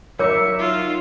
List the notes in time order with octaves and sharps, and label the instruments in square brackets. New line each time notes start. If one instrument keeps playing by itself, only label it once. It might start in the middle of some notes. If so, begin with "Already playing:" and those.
[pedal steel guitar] F#3 D#4 E5 [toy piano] A#4 C#5 D6 [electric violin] C#7
[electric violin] F4